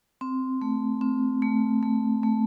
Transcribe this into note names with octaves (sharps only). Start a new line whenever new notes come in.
C4
A3
C4
A3
A3
A3